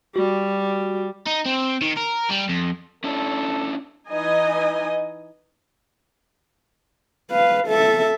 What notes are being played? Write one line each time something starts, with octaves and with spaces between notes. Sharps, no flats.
G3 F#4
D#4
C4
D#3
A#4
G3
F2
C#4 D4 E4 A4
E3 D#4 D#5 G#5
B4 F5
A4 E5